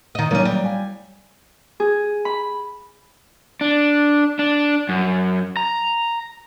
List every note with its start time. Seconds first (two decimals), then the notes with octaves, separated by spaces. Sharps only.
0.15 D#3 D#5
0.31 D#3 F#3 A#3 C#4
0.45 G3
0.65 G#5
1.80 G#4
2.25 B5
3.61 D4
4.39 D4
4.89 F#2
5.57 A#5